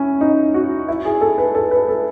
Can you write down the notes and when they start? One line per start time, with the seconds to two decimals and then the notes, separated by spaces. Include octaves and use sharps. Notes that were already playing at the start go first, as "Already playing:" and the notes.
Already playing: C#4 E4
0.21 D#4
0.54 F#4
0.88 E4
1.05 G#4
1.21 A4
1.38 B4
1.55 A4
1.71 B4
1.89 A4